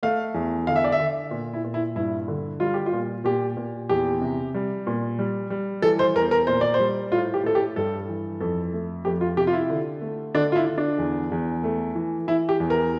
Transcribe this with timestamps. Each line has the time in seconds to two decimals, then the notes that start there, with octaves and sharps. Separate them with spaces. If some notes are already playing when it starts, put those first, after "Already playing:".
0.03 A3 F5
0.34 E2
0.67 D3 F5
0.76 E5
0.84 D5
0.92 E5
1.00 D3
1.31 A#2
1.54 E4
1.64 A#2
1.74 E4
1.96 G2 E4
2.28 D3
2.60 G3 F4
2.74 G4
2.86 F4
2.93 A#2
3.24 A#2 G4
3.57 A#2
3.89 E2 G4
4.22 C3
4.55 G3
4.87 A#2
5.19 G3
5.50 G3
5.82 E3 A4
5.99 C5
6.15 E2 A#4
6.31 A#4
6.47 A#2 C5
6.61 D5
6.74 C5
6.80 G3
7.11 A2 F4
7.34 G4
7.44 A2 A4
7.55 G4
7.76 G2 A4
8.09 E3
8.40 F2 A4
8.73 A3
9.05 F2 G4
9.21 F4
9.37 C3 G4
9.47 F4
9.53 E4
9.70 D3
10.01 A3
10.35 D3 D4
10.52 F4
10.56 E4
10.66 D3
10.78 D4
10.98 E2
11.32 E2
11.64 A3
11.95 E3
12.27 E3 E4
12.49 G4
12.60 E2
12.70 A#4